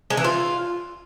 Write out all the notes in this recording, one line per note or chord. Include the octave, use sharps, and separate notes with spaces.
G#3
E3
F4